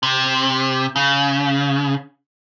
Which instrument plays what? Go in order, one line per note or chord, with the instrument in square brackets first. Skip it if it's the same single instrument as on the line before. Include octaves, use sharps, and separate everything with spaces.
[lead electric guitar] C3
C#3